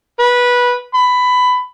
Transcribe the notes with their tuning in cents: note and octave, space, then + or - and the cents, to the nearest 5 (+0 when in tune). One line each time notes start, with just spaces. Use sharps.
B4 -15
B5 +15